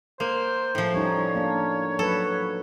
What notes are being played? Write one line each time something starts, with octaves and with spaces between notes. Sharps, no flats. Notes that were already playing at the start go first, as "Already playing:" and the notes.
A#3 C5
A2 F3
G3 C#4 D#4 C#5
A#3 D4
F#3 A4 B4